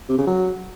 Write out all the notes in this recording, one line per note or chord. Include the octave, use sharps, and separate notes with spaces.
C3
C#3
F#3